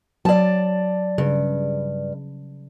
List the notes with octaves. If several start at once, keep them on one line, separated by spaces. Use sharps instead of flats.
F#3 D5 A5
G2 C#3